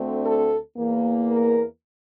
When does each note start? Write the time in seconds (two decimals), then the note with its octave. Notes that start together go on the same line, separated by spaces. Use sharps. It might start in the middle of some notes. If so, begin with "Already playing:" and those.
Already playing: D2 D3 A3 C4
0.24 A4
0.77 E2 E3 A#3
1.31 A#4